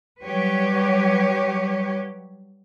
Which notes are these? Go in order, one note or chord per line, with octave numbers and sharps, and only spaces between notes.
F#3 G3 G4 B4 C#5